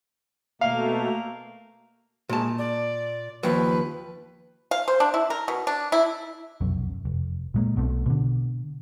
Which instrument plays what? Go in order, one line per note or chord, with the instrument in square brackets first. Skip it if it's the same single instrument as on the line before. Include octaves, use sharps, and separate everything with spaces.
[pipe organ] B2 A3 [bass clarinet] A#3 [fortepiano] F5
[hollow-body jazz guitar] A#2 A5 [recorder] G#3
[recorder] D5
[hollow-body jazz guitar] D#2 F3 [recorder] B4
[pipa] F5
C5
D4
E4
A#4
B2
D4
E4
[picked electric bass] F1 B1 F#2
F1
A#2 G#3 A#3
B1 B2 A3 C4
B2 D3